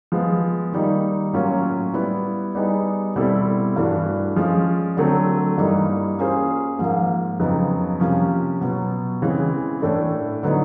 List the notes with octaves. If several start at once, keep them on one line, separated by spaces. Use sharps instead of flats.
F3 G#3 B3
D#3 G3 A#3 D#4
A2 F#3 A#3 C#4 F4
G3 B3 E4
G3 B3 D#4 G#4
B2 G3 C4 E4 A4
G2 E3 A3 D4 F#4
F3 G#3 C#4 F4
D3 F#3 A3 C4
G2 E3 G3 A#3 D#4
A#3 C#4 F4 G#4 C5
G#2 F3 A#3
F2 C#3 F#3 B3 D#4
C3 F3 A#3 C#4
B2 F#3 B3
C#3 E3 G#3 C4
A2 E3 A3 D4
D3 F#3 B3 D#4